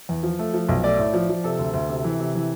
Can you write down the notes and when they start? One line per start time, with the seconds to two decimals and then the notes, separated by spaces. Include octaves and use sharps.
0.09 E2
0.23 F3
0.39 A3
0.54 F3
0.69 B1
0.84 A3 D5
0.99 A2
1.14 F3
1.29 F3
1.44 C3 A4
1.59 D2
1.74 D2
1.89 C3
2.04 E3
2.20 C3
2.35 E3